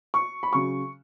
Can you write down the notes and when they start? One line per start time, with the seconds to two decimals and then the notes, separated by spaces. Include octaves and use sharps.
0.14 C#6
0.43 B5
0.53 C#3 F#3 C#6